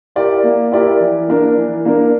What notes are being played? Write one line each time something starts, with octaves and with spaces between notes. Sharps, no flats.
E4 G4 A#4 D5
A#3
E4 G4 A#4 D5
E3
A#3 D4 A#4
E3
A#3 D4 A#4